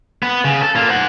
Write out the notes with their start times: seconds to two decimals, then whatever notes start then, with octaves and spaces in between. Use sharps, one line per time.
0.23 B3
0.45 C#3
0.62 A4
0.76 A#3 F4
0.89 C5 F#5